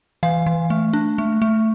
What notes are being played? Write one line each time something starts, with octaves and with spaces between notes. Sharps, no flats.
E3 F5
E3
A3
D4
A3
A3